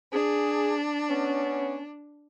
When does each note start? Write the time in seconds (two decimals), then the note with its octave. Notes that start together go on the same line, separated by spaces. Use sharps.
0.14 D4 G#4
1.09 B3 C#4